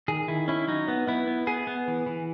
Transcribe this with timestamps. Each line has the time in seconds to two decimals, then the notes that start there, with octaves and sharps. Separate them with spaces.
0.08 D#3 G#4
0.28 D#3 E4
0.48 C#4 E4
0.68 F#3 D#4
0.88 B3
1.07 B3 E4
1.27 B3
1.47 B3 G#4
1.67 B3
1.88 E3
2.06 E3